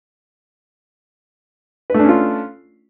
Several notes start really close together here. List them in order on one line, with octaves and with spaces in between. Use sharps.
B4 A3 D4 C#4 F4